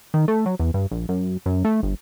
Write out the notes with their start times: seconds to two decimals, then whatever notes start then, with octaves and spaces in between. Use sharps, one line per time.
0.14 D#3
0.28 A3
0.46 F#3
0.59 E2
0.74 G2
0.91 A#1
1.09 F#2
1.46 F#2
1.65 A3
1.83 G1